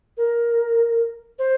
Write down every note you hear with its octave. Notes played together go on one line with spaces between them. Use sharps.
A#4
C5